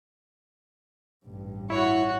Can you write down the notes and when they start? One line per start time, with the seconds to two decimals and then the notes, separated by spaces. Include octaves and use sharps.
1.26 A1 G2
1.70 E4 F#4 C#5